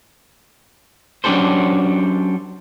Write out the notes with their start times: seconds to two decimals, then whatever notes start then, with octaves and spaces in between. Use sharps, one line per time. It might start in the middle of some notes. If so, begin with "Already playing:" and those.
1.24 F#3 C#4 D4 G4 A4 C5